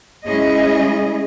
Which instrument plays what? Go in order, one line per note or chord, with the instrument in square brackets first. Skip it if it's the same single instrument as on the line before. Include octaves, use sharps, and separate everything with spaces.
[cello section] G#3 C#4 E4 G#4 D#5